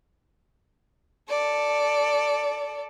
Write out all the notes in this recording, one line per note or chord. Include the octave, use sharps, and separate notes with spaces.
A4 D5